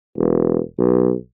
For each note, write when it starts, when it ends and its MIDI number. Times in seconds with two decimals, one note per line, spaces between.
0.17 0.58 28
0.79 1.13 35